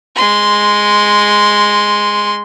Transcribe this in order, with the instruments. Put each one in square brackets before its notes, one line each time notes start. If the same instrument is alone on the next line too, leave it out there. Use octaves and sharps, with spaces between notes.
[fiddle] G#3 C6